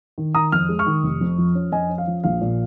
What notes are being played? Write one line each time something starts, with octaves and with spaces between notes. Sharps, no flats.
D#3
D#3 A#5 D#6
F2 F6
G#3
C#6 F6
D#3
F1
F2
F3
C#4
F2 D#5 G#5
C#4
F5
F3
A#1 F5
A#2